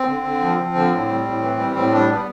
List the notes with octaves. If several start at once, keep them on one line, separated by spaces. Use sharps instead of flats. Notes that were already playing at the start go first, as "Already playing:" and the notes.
Already playing: C4
D3
D3
F3
F3
D3
A2
G3
A2
E3
G3
A2 C4
G3 D4
G3 B3